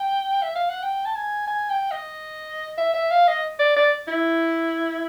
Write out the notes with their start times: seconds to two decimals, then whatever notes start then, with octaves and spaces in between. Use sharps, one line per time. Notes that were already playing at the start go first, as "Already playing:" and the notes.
Already playing: G5
0.42 E5
0.55 F5
0.69 F#5
0.83 G5
1.05 A5
1.15 G#5
1.48 G#5
1.70 G5
1.91 D#5
2.78 E5
2.94 E5
3.11 F5
3.28 D#5
3.59 D5
3.76 D5
4.08 E4